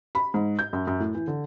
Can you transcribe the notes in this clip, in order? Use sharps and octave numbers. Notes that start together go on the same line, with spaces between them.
B5
G#2
G6
F#2
F#2
A2
E3
D3